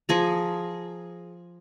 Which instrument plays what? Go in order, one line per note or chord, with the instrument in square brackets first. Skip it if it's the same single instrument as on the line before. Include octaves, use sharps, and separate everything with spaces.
[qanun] F3 G#4 A#5